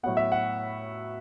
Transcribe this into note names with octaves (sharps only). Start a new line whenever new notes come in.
A2 F#3 B3 F#5
E5
F#5